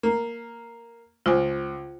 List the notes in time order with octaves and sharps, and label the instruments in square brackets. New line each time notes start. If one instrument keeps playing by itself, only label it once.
[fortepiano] A#3
[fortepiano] C#2 [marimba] F4 C5 G#5